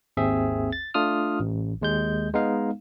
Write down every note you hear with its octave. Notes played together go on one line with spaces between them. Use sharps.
G#1 D#2 C4 G#4 E5
A6
A3 D4 F4 D#6 F6
A1
D#2 G#3 G6
G#3 B3 D#4 F5